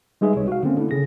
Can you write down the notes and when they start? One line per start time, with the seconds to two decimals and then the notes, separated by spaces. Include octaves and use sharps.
0.21 G3 G#3 D#4 G#4 B4 E5
0.36 C2 C#5
0.48 F#4 F5
0.63 D3 A#3 C4 C#4
0.77 D3 A3 A#3 E4
0.91 C#3 G#4 A#6